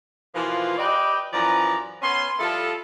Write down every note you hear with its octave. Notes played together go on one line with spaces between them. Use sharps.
B2 E3 F3 A#3 F4
G4 B4 D5 D#5 G5
F#2 E3 F3 D5 A#5
B3 C#4 C6
F3 G3 E4 A4